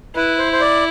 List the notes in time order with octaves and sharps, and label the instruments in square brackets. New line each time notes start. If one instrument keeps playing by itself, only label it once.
[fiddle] E4 [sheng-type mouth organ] B4
[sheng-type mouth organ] C5
C5
D5